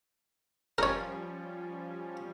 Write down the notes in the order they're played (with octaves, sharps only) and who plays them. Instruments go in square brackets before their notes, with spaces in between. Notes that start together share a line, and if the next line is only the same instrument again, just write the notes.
[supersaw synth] F3 G3 C#4 [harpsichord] A#4 C#5